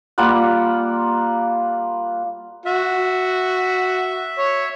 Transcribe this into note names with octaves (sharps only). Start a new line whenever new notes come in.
G3 A#3 F4 F#5
F#4 E5
C#5